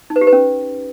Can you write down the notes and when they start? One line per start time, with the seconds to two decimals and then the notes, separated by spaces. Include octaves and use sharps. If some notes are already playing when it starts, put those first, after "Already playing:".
0.10 D#4
0.16 B4
0.21 G4
0.27 B4
0.33 C#4